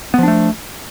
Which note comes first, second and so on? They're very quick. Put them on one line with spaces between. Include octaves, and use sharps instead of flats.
B3 F3 D4 A3